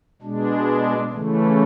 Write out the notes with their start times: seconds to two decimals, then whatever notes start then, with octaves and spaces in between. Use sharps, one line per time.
0.22 B2 G#3 D4
1.11 C#3 E3 A3